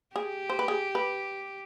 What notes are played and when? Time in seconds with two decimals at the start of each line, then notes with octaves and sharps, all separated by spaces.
0.16 G4 G#4
0.50 C5
0.59 B4
0.68 G#4
0.95 B4